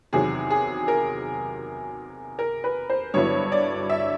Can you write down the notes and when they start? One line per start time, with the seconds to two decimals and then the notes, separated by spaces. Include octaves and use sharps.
0.12 E2 C3 D#3 F#3 G#4
0.50 G#4
0.88 A#4
2.39 A#4
2.64 B4
2.90 C5
3.14 G2 D3 F#3 B3 E4 C#5
3.52 D5
3.90 E5